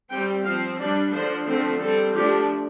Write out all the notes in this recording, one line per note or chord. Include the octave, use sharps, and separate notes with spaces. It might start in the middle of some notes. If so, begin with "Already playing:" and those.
G3 C4 G5
F3 C4 F5
G3 D4 D5
D3 F3 D4 C5
D3 F3 A3 C4
G3 C4 A4
F3 A3 D4 G4